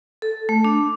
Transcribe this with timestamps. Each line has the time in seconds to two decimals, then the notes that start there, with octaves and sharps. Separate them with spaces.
0.22 A4
0.49 A3
0.65 D4